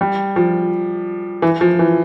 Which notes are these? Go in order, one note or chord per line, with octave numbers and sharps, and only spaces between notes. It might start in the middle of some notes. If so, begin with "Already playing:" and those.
G3
F3
E3
F3
E3